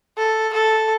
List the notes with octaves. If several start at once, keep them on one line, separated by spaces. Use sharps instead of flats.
A4
A4